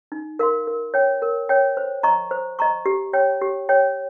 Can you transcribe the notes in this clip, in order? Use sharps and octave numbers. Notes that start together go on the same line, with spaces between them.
D#4
A#4 F5 C6
A#4
C#5 G5
A#4
C#5 G5
C5
D#5 A#5 C#6
C5
D#5 A#5 C#6
G4
C#5 G5
G4
C#5 G5